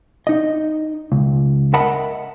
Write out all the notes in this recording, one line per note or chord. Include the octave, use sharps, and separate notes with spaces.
D#4 D#5
C#2
A#4 D#5 E5 F#5 A5 B5